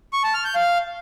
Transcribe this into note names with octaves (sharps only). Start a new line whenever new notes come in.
C#6
A5
F6
G6
F5